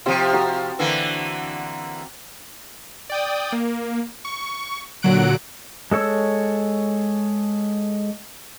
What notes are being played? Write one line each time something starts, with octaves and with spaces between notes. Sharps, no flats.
C3 F3 C4 G4
F#4 A#4
D3 E3 A#3
D5 G5 D#6
A#3
C#6
A#2 D3 F#3 F#5 F#6 D7
G#3 A4 C#5 E6